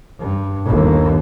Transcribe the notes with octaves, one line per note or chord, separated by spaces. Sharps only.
G2
G1 D#2